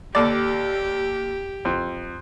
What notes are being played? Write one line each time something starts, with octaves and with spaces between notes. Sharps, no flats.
D#2 G4 A4 D5
F2